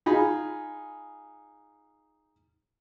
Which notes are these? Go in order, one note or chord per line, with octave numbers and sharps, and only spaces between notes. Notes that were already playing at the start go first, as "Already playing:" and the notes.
D#4 F4 G#4 B5